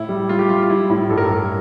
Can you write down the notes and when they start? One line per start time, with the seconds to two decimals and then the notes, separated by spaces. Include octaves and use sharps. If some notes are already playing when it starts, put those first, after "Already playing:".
Already playing: A2 E4
0.09 G3
0.29 G3 F4
0.39 G4
0.49 G3 F4
0.62 F4
0.70 G3 E4
0.90 A2 E4
1.10 G2 A4
1.18 A#4
1.26 G2 A4